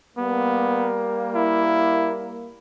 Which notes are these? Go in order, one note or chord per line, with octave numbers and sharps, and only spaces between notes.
G3 A#3 B3
E4